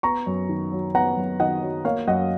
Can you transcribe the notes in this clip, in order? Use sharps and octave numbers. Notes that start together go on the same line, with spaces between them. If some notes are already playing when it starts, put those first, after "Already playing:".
B3 A#5 C#6
F#2
D#3
F#3
B3 F#5 A#5
F#2
D#3 D#5 F#5
F#3
A#3 C#5 F5
F#2 D#5 F#5